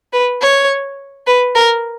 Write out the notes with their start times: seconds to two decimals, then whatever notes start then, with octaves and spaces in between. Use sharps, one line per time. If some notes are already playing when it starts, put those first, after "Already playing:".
0.13 B4
0.41 C#5
1.27 B4
1.55 A#4